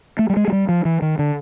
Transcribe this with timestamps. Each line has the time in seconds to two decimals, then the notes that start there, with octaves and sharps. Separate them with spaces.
0.19 A3
0.30 G3
0.37 G#3
0.48 G#3
0.52 G3
0.69 F3
0.85 E3
1.02 D#3
1.19 D3